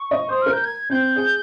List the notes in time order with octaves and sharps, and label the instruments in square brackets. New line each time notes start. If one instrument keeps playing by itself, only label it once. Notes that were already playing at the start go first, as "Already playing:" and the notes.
Already playing: [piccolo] C#6
[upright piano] D#5
[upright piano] C5 [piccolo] D#6
[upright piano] A#4 [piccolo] F6
[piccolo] G6
G#6
[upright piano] C4 [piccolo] G6
[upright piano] G#4